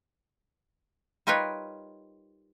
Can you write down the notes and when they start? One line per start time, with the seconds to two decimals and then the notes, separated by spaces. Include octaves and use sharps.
1.27 G3 D#4 F4 A#4 B4 C#5